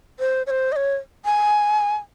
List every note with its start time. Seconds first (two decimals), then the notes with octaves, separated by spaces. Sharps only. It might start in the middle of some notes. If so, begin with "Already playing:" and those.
0.20 C5
0.47 C#5
0.51 C5
0.72 D#5
0.76 C#5
1.25 G#5